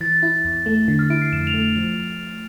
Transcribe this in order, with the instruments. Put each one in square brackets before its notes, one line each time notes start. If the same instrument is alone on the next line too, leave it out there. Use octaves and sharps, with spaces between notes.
[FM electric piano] E3 [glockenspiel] A6
[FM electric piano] E4
E2
A3
D3
[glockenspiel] F6
[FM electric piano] E4 [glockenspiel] D7
[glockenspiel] C7
[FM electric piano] F2 [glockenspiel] E7
[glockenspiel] F7
[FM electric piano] A3
[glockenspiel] F7
[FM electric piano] F3 [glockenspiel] F7